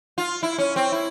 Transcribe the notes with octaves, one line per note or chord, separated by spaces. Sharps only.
F4
E4
C#4
C4
E4